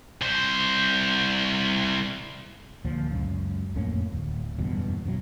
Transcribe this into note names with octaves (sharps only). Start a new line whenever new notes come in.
C2 C5
D2 A#2 F3
C#2 F#2
F2 A2 A#3 C#4
D1
F#1 E2 G2 B2
F#2 B2 E3 F#3